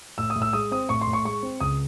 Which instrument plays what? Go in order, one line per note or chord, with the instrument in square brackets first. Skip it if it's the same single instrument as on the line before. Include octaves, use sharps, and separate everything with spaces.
[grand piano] A2 E6
D#6
A2
E6
G#3 D#6
C4 D#6
A2 C#6
C6
A2
C#6
G#3 C#6
C4
C#2 D#6